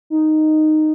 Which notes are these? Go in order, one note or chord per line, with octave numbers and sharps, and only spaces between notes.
D#4